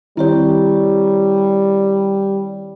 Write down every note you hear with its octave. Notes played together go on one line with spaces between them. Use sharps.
D#3 G3 C4 E4 G4 C#5